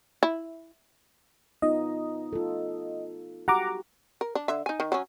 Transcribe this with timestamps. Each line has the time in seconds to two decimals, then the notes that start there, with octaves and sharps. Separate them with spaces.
0.23 E4
1.62 B3 D#4 F4 D#5
2.33 F4 A4
3.48 F#4 G4 F#5 A#5 D6
4.21 A#4
4.35 D4
4.48 D3 E5
4.66 D#4 G#5
4.80 D#3
4.92 F#3 C#4